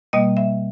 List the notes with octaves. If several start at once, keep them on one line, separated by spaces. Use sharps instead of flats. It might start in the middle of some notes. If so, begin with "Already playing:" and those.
B2 G3 A#3 D#5
E5